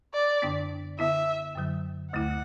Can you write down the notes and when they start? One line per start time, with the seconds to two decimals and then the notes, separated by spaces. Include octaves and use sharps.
0.14 D5
0.42 F#2 D3 B3 D4
0.99 D3 B3 E4 E5
1.56 F#2 D3 F#3
2.13 D2 D3 A3 E4 F#5